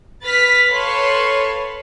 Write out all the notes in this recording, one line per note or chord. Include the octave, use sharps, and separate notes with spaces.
B4 F6 A6 B6
A4 B4 C#5 F5 A5 C6